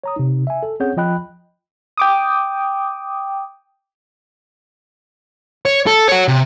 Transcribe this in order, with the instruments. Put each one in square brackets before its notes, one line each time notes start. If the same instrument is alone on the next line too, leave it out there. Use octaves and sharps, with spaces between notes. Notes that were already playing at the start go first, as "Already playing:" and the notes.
[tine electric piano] C#5 A#5 D#6
C3 D#4
E5 G#5
A4
C4 C#4 G#4 C#5 F#5 G6
F3 F4 D#5 G5 B5 F#6
[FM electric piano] G5 D6 D#6
[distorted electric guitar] C#5
A4
F#4 C#5
C3